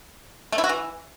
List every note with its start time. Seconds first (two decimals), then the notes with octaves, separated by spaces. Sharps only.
0.52 A3
0.58 E4
0.64 F#4
0.69 E3